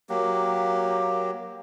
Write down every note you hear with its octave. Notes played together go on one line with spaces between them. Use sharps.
F#3 A#3 G4